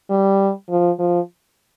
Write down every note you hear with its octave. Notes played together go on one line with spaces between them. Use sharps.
G3
F3
F3